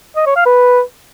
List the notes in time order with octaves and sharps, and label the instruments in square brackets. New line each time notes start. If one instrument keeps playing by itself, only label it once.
[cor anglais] D#5
C#5
F5
B4